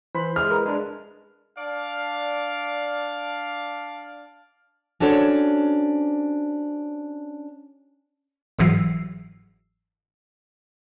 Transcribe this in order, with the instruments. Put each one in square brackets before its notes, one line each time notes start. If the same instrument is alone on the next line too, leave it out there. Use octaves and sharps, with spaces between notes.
[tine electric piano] E3 [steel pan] C5 B5
[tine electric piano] G#3 E4 G#4 [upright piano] F6
[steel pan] A#4 B4
[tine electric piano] G#3 D4
[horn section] D4 D5 F5
[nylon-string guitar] C#4 D4 F#4 A4 C5 C#5
[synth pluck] G1 G#2 E3 F#3 E6 C7